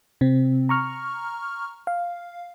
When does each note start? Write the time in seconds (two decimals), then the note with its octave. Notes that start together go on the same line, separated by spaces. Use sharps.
0.21 C3 C4
0.69 A#5 C#6 F6
1.87 F5